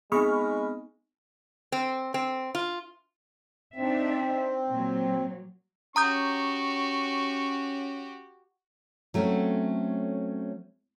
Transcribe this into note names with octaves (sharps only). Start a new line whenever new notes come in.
G#3 B3 C4 D#4 G#4 B5 C#6 F6
C4
C4
F4
C4 D4 D#4 E5
A#2 F#3
C#4 F#4 G4 A#5 C#6 D#6 G6
F#3 A3 C4 C#4